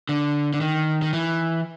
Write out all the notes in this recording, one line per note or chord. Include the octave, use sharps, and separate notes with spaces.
D3
D3
D#3
D#3
E3